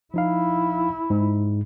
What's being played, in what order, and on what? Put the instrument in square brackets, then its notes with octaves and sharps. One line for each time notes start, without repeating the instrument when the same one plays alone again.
[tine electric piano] F3 D#4 F5 [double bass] E4
[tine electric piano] G#2